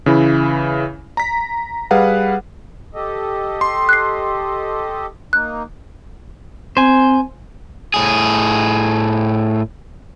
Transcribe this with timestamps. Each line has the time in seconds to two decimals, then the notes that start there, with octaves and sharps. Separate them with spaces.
0.06 C#3 E3 E4
1.17 A#5 B6
1.91 G3 G#4 B4 F5 F#5
2.95 G4 A4 D#5
3.61 C6
3.89 F#6 C7
5.33 A#3 D#4 F#6
6.77 C4 C5 G#5
7.94 A2 G#4